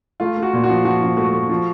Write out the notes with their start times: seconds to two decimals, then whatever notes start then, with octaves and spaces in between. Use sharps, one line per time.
0.20 A3 F4
0.37 A3
0.42 F#4
0.53 A#2
0.64 F#4
0.69 F3
0.85 F3 F#4
1.02 F3
1.17 A3 F#4
1.34 A3
1.49 F3